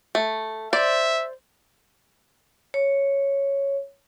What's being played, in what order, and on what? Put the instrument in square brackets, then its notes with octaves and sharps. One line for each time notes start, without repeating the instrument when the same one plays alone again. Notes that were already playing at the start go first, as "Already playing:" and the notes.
[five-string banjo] A3
[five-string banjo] C5 D5 [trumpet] E5
[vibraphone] C#5